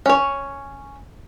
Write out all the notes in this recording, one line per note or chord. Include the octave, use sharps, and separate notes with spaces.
C#4 C#5